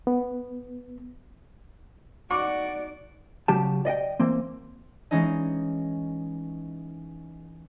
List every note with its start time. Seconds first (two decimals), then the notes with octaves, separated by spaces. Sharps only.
0.07 B3
2.31 D#4 F#4 D5 C#6 D6
3.48 C#3 F#3 G4 A5
3.85 D5 D#5 F#5 G5
4.20 E3 A#3 C4
5.11 E3 G#3 C#4 D#4 D#5